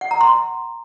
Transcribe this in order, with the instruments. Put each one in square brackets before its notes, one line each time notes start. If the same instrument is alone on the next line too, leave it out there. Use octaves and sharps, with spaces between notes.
[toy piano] F#5
A#5
C6